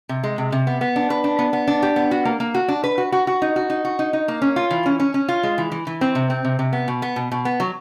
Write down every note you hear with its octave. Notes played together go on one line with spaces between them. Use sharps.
C3
G#3
C3
C3
B3
B3
D4
B4
D4
B3
B3
D4
G4
B3
F#4
A#3
A#3
F#4
D4
B4
F#4
F#4
F#4
D#4
F#4
D#4
F#4
D#4
D#4
A#3
C#4
F4
E3
C#4
C#4
C#4
F4
G#3
E3
E3
E3
C4
C3
C4
C3
C3
B3
B2
B3
B2
B2
B3
F#3